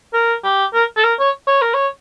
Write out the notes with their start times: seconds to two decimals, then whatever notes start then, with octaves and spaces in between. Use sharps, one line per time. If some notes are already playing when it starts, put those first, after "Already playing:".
0.13 A#4
0.44 G4
0.74 A#4
0.97 A4
1.04 A#4
1.20 C#5
1.47 C#5
1.61 A#4
1.74 C#5